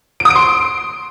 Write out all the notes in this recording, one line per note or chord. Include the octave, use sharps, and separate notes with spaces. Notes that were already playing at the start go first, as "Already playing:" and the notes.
D7
D#6
D7
C6